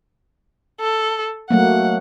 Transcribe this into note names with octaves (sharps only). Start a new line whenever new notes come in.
A4
F#3 A3 A#3 F#5